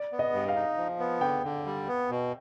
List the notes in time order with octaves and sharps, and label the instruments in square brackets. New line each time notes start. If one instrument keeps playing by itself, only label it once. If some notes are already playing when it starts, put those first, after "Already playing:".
Already playing: [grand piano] D5
[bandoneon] B3
[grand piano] D#5
[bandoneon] G2
[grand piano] F5
[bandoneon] D#4
F3
B3
[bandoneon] D3 [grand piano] G5
[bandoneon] D3
G3
B3
B2